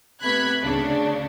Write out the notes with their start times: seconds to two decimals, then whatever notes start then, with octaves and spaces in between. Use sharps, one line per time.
0.22 C3 A3 B3 B5 F#6 G#6
0.62 D2 C#3 D4